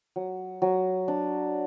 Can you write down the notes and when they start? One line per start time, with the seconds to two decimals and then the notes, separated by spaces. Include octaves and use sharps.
0.16 F#3
0.62 F#3
1.08 D4